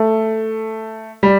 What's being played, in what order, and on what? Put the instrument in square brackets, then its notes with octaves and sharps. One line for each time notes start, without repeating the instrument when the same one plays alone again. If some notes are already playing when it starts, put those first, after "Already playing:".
Already playing: [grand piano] A3
G3